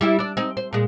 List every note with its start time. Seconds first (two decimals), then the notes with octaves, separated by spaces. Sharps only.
0.01 G3 E4 G4
0.19 D4 D5
0.37 C4 D#4
0.57 C5
0.73 A#2 G#3